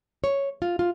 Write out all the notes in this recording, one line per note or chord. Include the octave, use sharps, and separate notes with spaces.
C#5
F4
F4